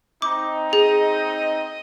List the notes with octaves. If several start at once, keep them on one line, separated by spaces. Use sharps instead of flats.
C4 D#4 D6
G#4 D#5